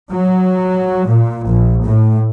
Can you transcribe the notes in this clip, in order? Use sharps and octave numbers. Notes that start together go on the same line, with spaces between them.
F#3
A#2
A#1
A2